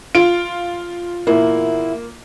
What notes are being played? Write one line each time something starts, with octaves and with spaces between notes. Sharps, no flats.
F4 D7
E2 A#2 A#3 E4